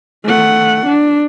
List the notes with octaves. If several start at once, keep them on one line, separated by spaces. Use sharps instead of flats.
A3 F#5
D4